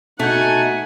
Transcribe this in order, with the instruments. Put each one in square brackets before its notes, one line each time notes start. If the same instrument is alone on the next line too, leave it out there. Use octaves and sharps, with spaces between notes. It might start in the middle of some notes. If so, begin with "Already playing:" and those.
[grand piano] B2 G6 [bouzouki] A3 [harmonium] D#4 [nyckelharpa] F#5 G#5